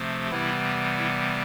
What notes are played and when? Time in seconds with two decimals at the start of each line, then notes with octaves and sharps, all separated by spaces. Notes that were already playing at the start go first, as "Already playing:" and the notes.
Already playing: C3 F3 A3 C4
0.31 C3 E3 G3 B3 E4
0.97 E4